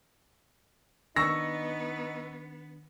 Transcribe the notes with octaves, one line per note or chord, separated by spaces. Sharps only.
D#3 B3 D4 D#4 C#6 E6 A#6